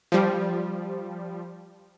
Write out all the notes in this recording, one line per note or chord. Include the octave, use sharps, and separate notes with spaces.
F3 G3